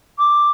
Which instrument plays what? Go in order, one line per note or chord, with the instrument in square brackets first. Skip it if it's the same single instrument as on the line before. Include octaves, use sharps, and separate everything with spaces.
[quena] D6